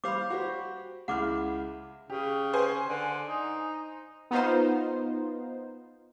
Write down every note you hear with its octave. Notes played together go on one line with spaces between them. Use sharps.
G3 C5 F5 B5 D6
F#4 G4 C5
C#2 E4 F#5 D6 F6
C#3 G4
C5 G#5
D3
D#4
B3 D#4 F4 C5